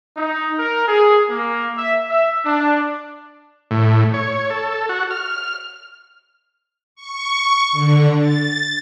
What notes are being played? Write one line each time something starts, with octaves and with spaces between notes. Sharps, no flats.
D#4
A#4
G#4
A#3
E5
E5
D4
A2
C#5
A4
F#4
F6
C#6
D3
A6